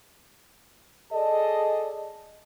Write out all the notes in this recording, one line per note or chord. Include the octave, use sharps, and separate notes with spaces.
G#4 A4 D5 D#5 A5